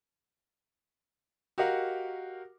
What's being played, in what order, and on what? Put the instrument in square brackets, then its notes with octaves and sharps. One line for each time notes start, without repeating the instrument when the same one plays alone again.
[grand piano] F#4 G4 A#4 D#5 F5 F#5